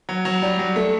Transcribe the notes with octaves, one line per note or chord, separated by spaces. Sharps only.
F#3
F#3
G3
F#3
A3